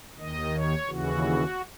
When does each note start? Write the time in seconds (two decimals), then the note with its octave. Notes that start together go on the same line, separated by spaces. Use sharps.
0.19 D#2 D#3 D#5
0.54 C#5
0.88 D#2 C#3 E3 F#4